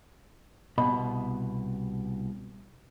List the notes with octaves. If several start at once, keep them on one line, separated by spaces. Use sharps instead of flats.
C2 B2 D#5 B5